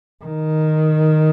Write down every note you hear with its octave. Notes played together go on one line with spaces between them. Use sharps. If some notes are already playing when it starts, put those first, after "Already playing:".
D#3